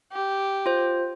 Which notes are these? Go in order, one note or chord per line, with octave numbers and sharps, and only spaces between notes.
G4
F4 C5